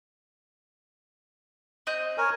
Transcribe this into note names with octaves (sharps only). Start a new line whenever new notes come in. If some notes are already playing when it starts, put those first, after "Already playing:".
C4 D#5 G6
A#4 C#5 G#5